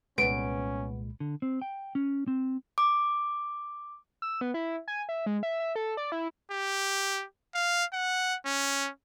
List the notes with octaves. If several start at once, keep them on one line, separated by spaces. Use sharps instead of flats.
C2 A#2 G#3 B3 C#4 D7
D3
C4
G5
C#4
C4
D6
E6
B3
E4
G#5
E5
G#3
E5
E5
A4
D5
E4
G4
F5
F#5
C#4